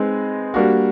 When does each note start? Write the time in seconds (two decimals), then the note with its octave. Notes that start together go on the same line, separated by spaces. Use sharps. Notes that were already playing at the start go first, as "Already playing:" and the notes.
Already playing: G#3 C4 D#4 G#4 B4
0.54 G3 A#3 D4 F#4